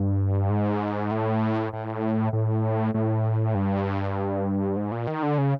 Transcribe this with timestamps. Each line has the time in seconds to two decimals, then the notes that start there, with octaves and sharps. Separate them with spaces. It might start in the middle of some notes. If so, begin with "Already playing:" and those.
Already playing: G2
0.50 G#2
1.11 A2
1.73 A2
2.33 A2
2.94 A2
3.55 G2
4.76 G#2
4.92 A#2
5.07 D#3
5.23 D3
5.38 C#3